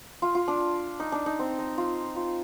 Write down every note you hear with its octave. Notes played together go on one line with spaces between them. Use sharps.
F4
F4
D4
D#4
D4
D#4
C4
D#4
F4
F4